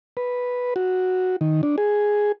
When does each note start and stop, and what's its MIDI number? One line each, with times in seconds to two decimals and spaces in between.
0.17 0.74 71
0.76 1.36 66
1.41 1.61 51
1.63 1.76 62
1.78 2.32 68